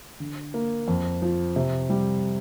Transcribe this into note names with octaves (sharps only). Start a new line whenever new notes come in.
D3
A#3
F2
F3
C3
G3